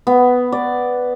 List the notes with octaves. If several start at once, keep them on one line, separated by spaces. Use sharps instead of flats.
B3
D5